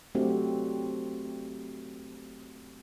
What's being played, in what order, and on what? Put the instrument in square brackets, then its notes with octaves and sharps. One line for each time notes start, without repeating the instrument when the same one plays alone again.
[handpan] F#3 A3 C4 D4 F#4 G4